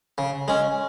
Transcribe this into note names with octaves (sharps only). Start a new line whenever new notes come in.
C#3
G#3 C#4